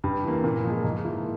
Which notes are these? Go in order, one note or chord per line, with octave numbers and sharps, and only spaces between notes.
G2
E3 A#3
A#2
F3 G#3
G#2
F3 A#3 E4